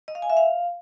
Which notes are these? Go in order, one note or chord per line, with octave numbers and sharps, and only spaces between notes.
D#5
F5
G#5
E5
F5